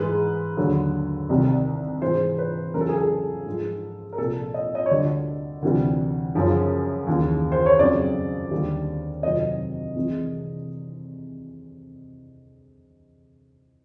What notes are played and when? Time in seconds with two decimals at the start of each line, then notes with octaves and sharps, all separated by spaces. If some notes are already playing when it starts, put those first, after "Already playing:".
Already playing: G#2 E3 G#3 B4
0.57 D#2 D3 F#3
1.29 C2 C3 D#3 G3
2.02 G#2 E3 G#3 C5
2.38 B4
2.74 E2 C#3 F#3 A#4
2.81 A4
2.89 G#4
2.96 A4
3.46 G#2 F3 G#3
4.13 A#4
4.18 C2 A#2 F3 A4
4.54 D#5
4.75 D#5
4.86 C#5
4.90 D2 D3 G3 D5
5.62 D2 C3 E3 G3
6.35 F#2 C#3 F3
7.07 D#2 C#3 E3
7.52 C5
7.66 C#5
7.79 F2 C#3 F#3 D5
8.51 D#2 D3 G3
9.23 F2 C3 D#3 F#3 D#5
9.95 C2 C3 E3 G#3